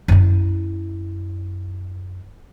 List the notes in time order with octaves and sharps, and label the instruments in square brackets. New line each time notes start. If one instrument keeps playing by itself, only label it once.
[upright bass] F#2 E4